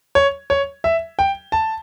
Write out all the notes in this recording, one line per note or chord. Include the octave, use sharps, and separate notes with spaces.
C#5
C#5
E5
G5
A5